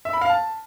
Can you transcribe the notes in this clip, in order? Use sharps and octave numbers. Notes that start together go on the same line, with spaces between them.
E5
B5
F5
A5